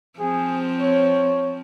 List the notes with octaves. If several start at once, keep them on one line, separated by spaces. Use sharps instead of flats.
F3 C4 G#4
C#5